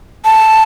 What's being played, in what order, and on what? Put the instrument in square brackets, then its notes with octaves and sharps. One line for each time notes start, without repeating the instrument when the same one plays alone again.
[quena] A5